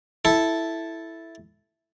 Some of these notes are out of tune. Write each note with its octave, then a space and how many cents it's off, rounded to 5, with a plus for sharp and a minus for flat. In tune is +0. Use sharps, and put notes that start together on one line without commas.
E4 +0 A4 -5